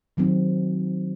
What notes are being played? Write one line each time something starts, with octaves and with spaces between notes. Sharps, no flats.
D#3 F#3 C4 D#4